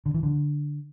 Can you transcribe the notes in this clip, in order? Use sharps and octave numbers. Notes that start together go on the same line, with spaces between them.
D3
E3
D3